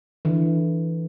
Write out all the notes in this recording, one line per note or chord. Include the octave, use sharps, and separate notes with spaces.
D3 E3